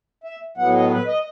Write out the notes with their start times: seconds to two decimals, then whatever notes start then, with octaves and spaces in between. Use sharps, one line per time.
0.24 E5
0.57 A2 F#3 B3 F#5
0.74 D#5
0.91 B4
1.07 D#5